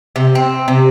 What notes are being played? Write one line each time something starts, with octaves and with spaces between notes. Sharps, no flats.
C3
C4
C3